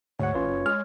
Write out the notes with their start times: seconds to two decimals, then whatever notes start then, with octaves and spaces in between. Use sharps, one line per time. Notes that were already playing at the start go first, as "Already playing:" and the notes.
0.19 D2 G#2 C#5 F#5
0.34 A1 C#4 F4 B4
0.47 F#1
0.66 G#3 F6